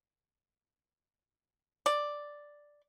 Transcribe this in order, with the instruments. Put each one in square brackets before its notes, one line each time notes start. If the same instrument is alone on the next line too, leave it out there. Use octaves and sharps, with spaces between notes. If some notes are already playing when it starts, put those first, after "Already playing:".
[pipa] D5